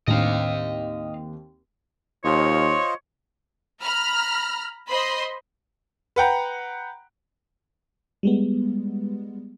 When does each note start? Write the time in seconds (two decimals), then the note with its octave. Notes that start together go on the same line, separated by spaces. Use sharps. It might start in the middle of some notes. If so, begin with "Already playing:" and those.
0.07 D#2 A2 C4 D4 D#5 F5
2.24 D#2 F4 C5 C#5 D#5
3.83 A#5 B5 F6
4.90 C5 D#5 B5 C6 D#6 C7
6.16 B4 F#5 G5 A#5
8.23 G3 G#3 B3